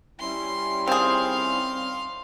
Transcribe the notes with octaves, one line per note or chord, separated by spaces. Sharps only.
G3 C#4 E4 C6
D#3 C4 G#4 C5 F5 C6